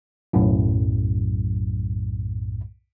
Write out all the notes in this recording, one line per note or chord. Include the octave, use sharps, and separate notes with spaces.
B1 F#2 A2